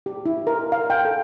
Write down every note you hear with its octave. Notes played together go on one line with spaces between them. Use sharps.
G4
E4
A#4
F5
G5
A4